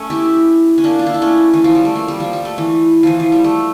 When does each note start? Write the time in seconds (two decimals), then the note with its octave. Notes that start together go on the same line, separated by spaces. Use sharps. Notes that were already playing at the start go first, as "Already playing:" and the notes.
Already playing: A3 C#4
0.10 E4 G4
0.78 C#4
0.84 A#3 D4
0.99 F4
1.07 E4
1.14 D4
1.22 A3 C#4
1.54 E3
1.64 F3
1.75 G3
1.85 A3
1.96 A#3
2.08 G3
2.20 F3
2.33 G3
2.45 A3
2.58 E3
3.03 E3 F3
3.20 F3
3.32 G3
3.44 A3